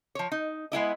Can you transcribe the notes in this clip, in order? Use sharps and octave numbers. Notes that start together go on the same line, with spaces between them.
F3 C#5
D#4
G#3 B3 E4 D#5